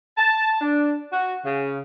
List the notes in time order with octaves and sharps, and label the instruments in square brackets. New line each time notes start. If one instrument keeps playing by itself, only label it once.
[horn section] A5
D4
F#4
C#3